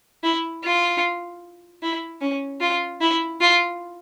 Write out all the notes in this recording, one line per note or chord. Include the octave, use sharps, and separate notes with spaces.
E4
F4
E4
C#4
F4
E4
F4